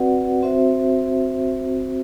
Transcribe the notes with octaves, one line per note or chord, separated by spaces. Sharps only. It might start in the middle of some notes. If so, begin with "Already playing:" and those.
Already playing: C4 F#4 B4 D5 F#5
C4 F#4 C5 E5
C4 F#4 C5 E5